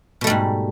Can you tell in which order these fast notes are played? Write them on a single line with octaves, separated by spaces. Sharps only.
B2 A3 G3 G#2